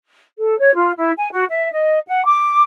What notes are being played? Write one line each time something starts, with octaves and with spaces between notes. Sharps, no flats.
A4
C#5
F4
E4
G#5
F#4
E5
D#5
F#5
D6